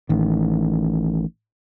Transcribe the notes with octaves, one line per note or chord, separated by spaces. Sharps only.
A1 D#3